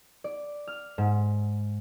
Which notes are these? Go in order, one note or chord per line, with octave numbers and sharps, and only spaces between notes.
D5
F6
G#2